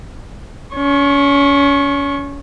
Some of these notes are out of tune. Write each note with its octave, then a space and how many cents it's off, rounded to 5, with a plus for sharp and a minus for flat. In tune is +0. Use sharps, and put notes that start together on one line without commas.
C#4 +30 C#6 -25